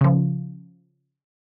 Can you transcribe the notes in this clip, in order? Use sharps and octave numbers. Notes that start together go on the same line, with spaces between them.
C#3 F3